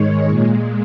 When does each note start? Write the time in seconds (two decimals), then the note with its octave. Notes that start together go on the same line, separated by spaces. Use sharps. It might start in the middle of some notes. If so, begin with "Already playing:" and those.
Already playing: G#2 D#3 G#3 C#5
0.28 A#2 G#3